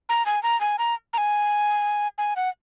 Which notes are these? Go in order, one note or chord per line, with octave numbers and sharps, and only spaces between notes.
A#5
G#5
A#5
G#5
A#5
A#5
G#5
G#5
F#5